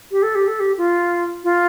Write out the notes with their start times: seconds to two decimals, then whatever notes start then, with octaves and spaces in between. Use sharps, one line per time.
0.11 G4
0.23 A4
0.35 G4
0.47 A4
0.60 G4
0.78 F4
1.44 F4